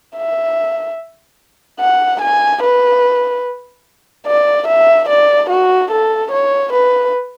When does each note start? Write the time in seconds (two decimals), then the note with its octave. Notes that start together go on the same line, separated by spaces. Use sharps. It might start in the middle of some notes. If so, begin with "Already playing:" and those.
0.17 E5
1.80 F#5
2.22 G#5
2.63 B4
4.27 D5
4.67 E5
5.09 D5
5.50 F#4
5.91 A4
6.31 C#5
6.73 B4